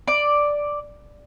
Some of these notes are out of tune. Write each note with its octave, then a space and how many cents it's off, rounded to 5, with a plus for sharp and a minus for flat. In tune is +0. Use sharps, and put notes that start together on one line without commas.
D5 +0